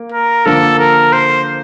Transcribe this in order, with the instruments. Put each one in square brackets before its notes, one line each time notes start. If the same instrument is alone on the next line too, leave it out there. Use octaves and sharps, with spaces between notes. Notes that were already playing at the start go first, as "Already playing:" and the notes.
Already playing: [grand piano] A#3
[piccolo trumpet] A#4
[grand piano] D3 F3 A#3 [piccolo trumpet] A4
[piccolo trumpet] A#4
C5